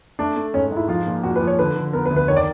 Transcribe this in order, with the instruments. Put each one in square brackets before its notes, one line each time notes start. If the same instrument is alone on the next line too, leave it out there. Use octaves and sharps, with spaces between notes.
[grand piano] A3 [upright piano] D4
[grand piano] A3
[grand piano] G#2 [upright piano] C#4
[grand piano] G#2
[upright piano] E4
[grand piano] F3 [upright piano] F4
[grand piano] A#2
[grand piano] A#2 [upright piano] F#4
[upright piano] B4
[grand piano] F3
[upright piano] C#5
[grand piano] D3 [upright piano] B4
[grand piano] D3
[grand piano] B3 [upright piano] A#4
[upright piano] B4
[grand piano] D2
[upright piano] B4
[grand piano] D#3 [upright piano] C#5
[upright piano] D5